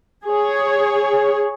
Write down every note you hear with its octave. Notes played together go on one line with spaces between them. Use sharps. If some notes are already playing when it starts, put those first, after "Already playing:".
G#4 C#5